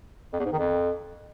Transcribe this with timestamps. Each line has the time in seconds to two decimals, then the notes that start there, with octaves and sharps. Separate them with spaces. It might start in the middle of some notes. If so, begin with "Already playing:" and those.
0.33 F2
0.39 E2
0.46 G#2
0.52 D#3
0.59 F2